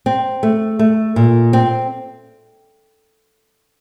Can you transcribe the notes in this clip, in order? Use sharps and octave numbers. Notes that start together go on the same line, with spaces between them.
C4
A3
A3
A#2
C4